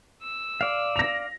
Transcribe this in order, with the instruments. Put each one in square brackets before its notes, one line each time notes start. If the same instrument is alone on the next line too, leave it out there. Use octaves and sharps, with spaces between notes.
[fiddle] E6
[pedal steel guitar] D5 F5
[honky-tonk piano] A#6 F7